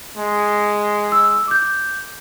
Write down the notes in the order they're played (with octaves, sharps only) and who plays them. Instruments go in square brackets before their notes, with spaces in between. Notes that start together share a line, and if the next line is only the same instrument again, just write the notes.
[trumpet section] G#3
[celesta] E6
D6 G6